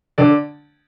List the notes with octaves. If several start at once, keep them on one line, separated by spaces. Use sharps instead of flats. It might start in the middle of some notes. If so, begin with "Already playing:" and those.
D3 D5